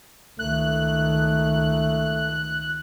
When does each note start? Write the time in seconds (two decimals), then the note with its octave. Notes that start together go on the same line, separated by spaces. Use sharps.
0.39 C#2 D#3 A3 F#6